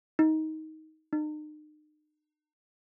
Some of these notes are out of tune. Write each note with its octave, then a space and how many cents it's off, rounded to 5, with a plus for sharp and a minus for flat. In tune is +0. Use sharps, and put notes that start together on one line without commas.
D#4 +15
D#4 -40